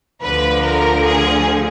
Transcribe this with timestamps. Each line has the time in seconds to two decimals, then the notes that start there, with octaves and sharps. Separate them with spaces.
0.23 D2 D3 F3 B4
0.64 A#4
1.04 G#4